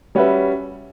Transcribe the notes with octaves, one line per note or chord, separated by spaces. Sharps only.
G3 C#4 F#4 B4 E5